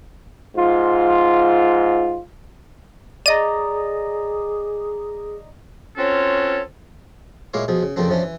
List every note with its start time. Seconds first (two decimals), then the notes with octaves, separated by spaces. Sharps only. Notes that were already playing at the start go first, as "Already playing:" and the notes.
0.56 G#2 F4
3.26 G#4 D5 D#5 A#5 D#7
5.97 C4 C#4 F4 F#4 A4 C#5
7.54 A#2 G#3 E4 C#5 F5 D6
7.68 B2 F3 G#4
7.83 C#3
7.96 F2 C#3 F3 A#3 C4 D4
8.10 E3 F3 C#4 D4
8.23 E3